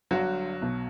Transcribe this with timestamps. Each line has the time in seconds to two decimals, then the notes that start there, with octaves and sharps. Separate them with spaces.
0.11 G1 G2 D3 F#3 F#4
0.61 B1 B2